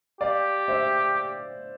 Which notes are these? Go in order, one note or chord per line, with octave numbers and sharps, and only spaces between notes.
G4 D5 F5
C5 E5